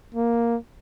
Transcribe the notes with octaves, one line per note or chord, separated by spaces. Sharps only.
A#3